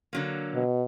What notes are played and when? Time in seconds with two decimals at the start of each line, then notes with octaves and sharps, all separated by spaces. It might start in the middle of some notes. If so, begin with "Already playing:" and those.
0.13 D3 F#3 A#3
0.54 B2